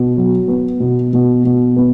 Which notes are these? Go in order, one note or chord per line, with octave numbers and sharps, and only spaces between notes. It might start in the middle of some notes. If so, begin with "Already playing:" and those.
Already playing: B2
F#3
B3
B2
B2
B2
B3